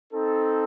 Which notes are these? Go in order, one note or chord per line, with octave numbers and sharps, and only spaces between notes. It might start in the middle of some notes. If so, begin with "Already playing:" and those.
C4 D#4 A4